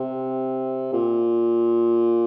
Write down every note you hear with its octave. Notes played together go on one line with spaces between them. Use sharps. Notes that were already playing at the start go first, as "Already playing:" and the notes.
Already playing: C3
A#2